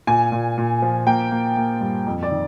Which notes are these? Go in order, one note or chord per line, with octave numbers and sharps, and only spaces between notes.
A#2 G#5
A#2
A#2
F3
A#3 G5
A#3
A#3
G2
F2
D5
D#3